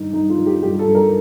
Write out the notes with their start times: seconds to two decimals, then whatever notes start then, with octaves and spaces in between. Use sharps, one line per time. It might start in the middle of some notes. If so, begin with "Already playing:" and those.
Already playing: G2 D#3 D#4
0.13 G2 D#4
0.30 F4
0.38 D#3
0.46 G4
0.63 G2 G4
0.79 A4
0.87 G2
0.95 A#4